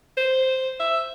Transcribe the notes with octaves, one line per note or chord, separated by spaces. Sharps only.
C5
E5